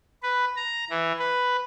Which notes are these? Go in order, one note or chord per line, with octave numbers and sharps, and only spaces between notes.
B4
A#5
E3
B4